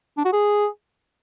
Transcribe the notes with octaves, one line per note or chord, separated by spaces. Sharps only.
D4
F#4
G#4